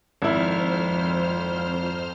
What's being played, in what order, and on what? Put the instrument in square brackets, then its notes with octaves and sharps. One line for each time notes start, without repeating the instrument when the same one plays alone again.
[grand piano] G#1 E4 [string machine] F2 C5 F6